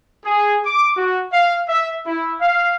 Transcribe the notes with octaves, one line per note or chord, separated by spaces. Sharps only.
G#4
D6
F#4
F5
E5
E4
F5